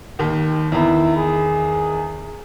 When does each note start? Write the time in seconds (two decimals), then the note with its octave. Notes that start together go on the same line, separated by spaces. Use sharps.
0.19 D#2 D#3
0.72 E2 D#3 E4
1.16 G#4